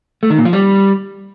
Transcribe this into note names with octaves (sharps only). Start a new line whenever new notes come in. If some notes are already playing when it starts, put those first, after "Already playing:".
A3
D#3
A#2
F3
G3